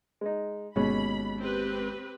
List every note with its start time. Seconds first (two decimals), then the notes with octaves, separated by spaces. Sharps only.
0.21 G#3 D#4
0.76 G1 D#2 B2 G#3 C#4 B5
1.41 C4 G4 B4